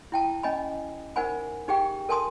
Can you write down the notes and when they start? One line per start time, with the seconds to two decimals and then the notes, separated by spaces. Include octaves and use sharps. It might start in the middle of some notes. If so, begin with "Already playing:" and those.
0.12 E4 G5 A5
0.43 C#4 D#5 G#5 B5
1.16 D#4 A#4 C5 F#5 G#5 B5
1.68 D#4 G4 G#4 G5
2.09 A4 A#4 G#5 A5 C6 D#6